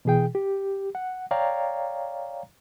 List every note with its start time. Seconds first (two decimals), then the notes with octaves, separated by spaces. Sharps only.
0.05 B2 E3 G#4 G5
0.35 G4
0.95 F#5
1.31 C#5 D5 F5 G5 A#5